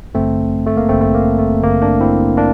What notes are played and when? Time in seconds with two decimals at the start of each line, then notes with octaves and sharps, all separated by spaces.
0.15 A1 G2 D3 A3 C4
0.66 A3
0.77 A#3
0.89 A1 G2 D3 A3 C4
1.02 A3
1.14 A#3
1.39 A3
1.63 A1 G2 D3 A#3
1.82 A#3 D4
2.00 C4 E4
2.37 A#3 D4